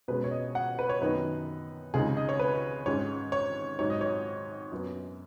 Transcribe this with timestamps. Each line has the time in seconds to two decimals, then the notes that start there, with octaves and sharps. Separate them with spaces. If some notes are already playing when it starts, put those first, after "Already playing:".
0.08 B2 G#3 C#4 B4
0.24 C#5
0.31 D#5
0.55 F#5
0.79 B4
0.89 C#5
1.01 F#2 D#3 B3 D#4 B4
1.94 C#2 C#3 G#3 D#4 G#4
2.17 D#5
2.29 C#5
2.40 B4
2.86 G#2 G#3 C#4 C#5
3.32 C#5
3.79 G#2 F#3 D#4 C#5
3.90 D#5
4.01 C#5
4.72 F#2 F#3 B3